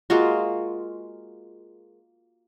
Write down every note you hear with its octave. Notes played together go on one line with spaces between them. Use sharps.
G#3 A#3 F4 F#4